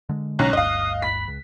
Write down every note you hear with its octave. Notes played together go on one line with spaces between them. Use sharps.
D3 G#3
B1 C#4 A#5 F#6
G1 D2 G2 D#5 F5 D#6
B5 B6
C#2